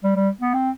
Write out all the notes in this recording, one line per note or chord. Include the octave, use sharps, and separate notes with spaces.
G3
G3
B3
C4